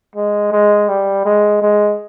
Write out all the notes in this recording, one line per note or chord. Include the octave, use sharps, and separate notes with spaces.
G#3
G#3
G3
G#3
G#3